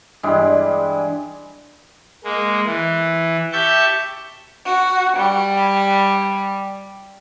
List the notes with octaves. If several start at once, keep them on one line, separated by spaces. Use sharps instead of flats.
G2 E3 G3 G#3
G#3 A#3
E3
G4 E5 A5 C#6 G6
F#4
G3